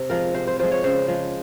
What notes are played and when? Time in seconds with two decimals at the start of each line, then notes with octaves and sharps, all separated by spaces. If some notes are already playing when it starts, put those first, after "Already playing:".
Already playing: C3
0.10 F3 G#3 A#4
0.34 C3 C5
0.47 C5
0.59 F3 G#3 C5
0.72 C#5
0.84 C#3 C5
1.08 F3 G#3